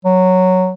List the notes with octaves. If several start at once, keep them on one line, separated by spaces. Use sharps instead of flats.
F#3